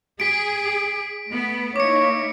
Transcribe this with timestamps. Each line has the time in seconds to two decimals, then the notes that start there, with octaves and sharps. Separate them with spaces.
0.20 G#4 B6 D7
1.26 A3 B3
1.76 A#3 D#4 E4 C#5 D6 C#7